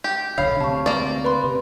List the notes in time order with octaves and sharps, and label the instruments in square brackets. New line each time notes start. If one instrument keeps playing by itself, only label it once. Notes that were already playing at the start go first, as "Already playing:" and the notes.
[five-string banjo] G4
[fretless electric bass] D#1 B1 D3 [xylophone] C#5 B5 C7 [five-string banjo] F5
[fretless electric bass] D2 C3 [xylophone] A5 C#6
[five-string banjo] A#3 D5
[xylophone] B4 B5 C6
[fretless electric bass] C3